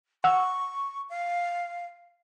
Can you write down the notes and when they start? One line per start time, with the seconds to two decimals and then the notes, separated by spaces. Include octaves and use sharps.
0.24 F#5 C#6 E6
1.10 F5